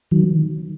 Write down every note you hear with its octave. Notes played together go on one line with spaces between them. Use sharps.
D#3 F#3